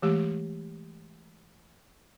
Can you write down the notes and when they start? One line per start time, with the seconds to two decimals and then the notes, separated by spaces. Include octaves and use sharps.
0.02 E3 G#3 A3 G4